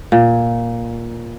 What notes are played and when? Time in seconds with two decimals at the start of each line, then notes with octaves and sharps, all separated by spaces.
0.12 A#2